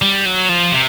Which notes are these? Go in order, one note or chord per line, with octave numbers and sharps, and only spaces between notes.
G3
F#3
F3
C3